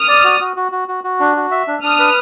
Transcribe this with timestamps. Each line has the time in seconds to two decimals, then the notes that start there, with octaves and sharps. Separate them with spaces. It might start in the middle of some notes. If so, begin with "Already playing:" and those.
Already playing: D#6 F6
0.08 D5
0.24 F#4
0.40 F#4
0.56 F#4
0.72 F#4
0.88 F#4
1.04 F#4
1.20 D4
1.36 F#4
1.51 E5
1.68 D4
1.83 D4 D#6 F6
1.99 B4